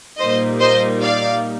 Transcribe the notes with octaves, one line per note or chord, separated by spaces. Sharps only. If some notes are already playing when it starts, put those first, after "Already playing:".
A#2 G3 A#3 D#4 C5 D#5
C5 D#5
D5 F5